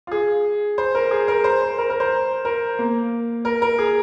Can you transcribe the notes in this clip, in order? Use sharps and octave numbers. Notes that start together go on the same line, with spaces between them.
F4
G#4
C5
A#4
G#4
A#4
C5
C5
A#4
A#4
C5
A#4
A#3
A#4
A#4
G#4